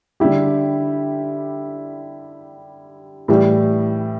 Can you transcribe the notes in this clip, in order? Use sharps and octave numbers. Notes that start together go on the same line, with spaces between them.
D3 G3 E4 G4
A2 E3 G3 E4